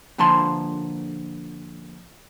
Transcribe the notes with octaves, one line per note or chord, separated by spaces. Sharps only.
A#2 D3 F3 A5 C6